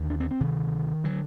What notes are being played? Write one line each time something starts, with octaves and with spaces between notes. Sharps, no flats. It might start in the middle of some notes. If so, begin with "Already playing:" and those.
Already playing: D#2 D3
D4
C4
C4
D2 C3 D#3
D3 F#3